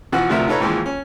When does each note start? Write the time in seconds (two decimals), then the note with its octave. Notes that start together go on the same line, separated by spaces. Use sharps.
0.12 B2 E3 F3 F#4 F#5
0.30 D2 C3 F3 A3 A#4 E5
0.48 D#4 F4 A4 B4 C#5 A#5
0.60 D#2 G#2 E3 F3 G#3
0.86 C#4